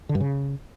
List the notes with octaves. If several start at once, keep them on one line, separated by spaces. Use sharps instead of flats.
D3
G2
C#3